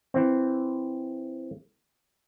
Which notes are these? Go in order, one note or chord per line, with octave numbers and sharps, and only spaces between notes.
E3 C4